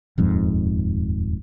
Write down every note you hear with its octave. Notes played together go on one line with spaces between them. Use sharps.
D#1 F2 G#2